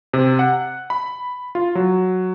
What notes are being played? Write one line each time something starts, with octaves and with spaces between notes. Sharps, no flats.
C3
F#5
B5
F4
F#3